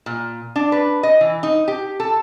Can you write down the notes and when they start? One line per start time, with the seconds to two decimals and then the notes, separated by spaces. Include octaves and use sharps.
0.06 A#2
0.56 D4
0.72 B4
1.03 D#5
1.21 E3
1.43 D#4
1.68 G4
2.00 A4